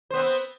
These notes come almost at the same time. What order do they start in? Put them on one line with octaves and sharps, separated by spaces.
C5 B3 C4